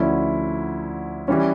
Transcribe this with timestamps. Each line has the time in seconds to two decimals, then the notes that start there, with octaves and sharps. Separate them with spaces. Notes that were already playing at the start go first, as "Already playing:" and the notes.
Already playing: D2 D3 F3 C#4 E4
1.28 E3 G3 C#4